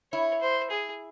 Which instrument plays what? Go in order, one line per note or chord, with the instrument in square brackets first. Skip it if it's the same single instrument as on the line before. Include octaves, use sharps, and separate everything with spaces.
[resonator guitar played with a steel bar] E4 [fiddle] C#5
[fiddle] C5
G#4